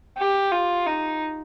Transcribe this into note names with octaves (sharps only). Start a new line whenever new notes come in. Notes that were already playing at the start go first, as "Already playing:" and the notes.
G4
F4
D#4